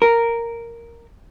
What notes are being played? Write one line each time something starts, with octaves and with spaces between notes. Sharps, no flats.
A#4